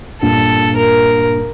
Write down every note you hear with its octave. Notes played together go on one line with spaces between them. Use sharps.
G2 A#2 A4
A#4